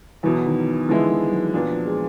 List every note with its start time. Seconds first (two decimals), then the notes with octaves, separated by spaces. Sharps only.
0.23 E2 B2 E3 F#3
0.46 D#3
0.88 D3 E3 F3 G#3 B3 E4
1.11 E3
1.31 F#3
1.53 A#2 E3 F#3 B3 D4
1.70 F3
1.85 G#3